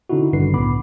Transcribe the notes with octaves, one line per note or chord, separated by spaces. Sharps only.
D3 C#4 D#4 E4 F#4
G#1 G2 D3 D#3 B4 C7
C2 A2 B3 B5 D6